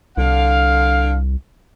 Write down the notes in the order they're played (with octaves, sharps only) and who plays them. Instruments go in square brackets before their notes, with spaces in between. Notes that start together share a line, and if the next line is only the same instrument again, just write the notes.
[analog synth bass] C2 [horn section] D3 F5